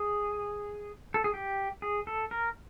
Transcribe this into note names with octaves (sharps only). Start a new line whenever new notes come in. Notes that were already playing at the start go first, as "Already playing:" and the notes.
Already playing: G#4
A4
G#4
G4
G#4
A4
A#4